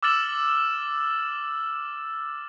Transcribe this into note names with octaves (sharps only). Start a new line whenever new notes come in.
D6 E6 F6 A6 E7 F#7